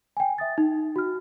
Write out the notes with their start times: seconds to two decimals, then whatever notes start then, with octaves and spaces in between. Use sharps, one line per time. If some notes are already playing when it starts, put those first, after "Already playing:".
0.17 G5 G#5
0.38 E5 D#6 A6
0.58 D#4
0.96 F#4 F6